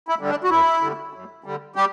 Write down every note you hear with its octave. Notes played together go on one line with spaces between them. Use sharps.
E4
D3 G3
D4
F#4
F#2 E4
D3 G3
F#2
D3 G3
G3 G4